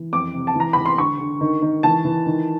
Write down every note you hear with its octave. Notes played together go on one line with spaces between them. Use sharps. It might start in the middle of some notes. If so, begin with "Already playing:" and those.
Already playing: E3
F2 D6
C3
A5
E3 A#5
E3 B5
C6
D3 C#6
D3
D#3
D#3
E3 A5
E3
D#3